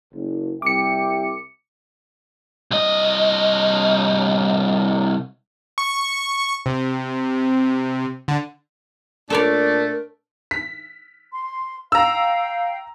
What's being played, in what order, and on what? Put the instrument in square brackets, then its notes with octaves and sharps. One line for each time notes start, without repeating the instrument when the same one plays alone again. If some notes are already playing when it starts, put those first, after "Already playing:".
[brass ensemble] F#1
[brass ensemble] C2 E5 G5 [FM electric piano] D6 C#7
[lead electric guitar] C2 D#5
[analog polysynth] C#6
C3
D3
[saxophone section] A#2 D4 [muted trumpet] A3 [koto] A4 C#5 D5 [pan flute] A#4
[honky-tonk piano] B6
[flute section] C6
[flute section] F5 G5 [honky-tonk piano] A#5 E6